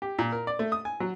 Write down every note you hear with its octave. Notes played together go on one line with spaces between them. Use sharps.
G4
A#2
A#4
D5
A3
D#6
G#5
F#3